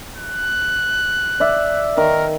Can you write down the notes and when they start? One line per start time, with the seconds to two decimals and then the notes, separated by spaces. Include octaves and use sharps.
0.18 F#6
1.40 D5 E5
1.97 D#3 A#4